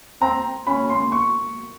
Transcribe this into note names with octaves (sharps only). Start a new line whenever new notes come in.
C4 A#5
C#4 B5
C6
C#6